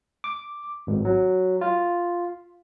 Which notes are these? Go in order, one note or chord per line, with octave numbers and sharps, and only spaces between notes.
D6
G#1
F#3
F4